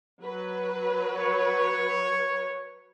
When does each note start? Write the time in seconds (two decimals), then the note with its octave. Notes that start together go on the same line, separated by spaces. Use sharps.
0.23 F#3 B4
1.15 C#5